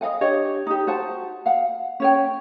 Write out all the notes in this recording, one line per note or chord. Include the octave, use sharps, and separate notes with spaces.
D#5 F5 F#5 G#5
D4 G4 C#5 D#5
D#4 G4
F#4 C5 F#5 A5
F5 F#5
C#4 C#5 G5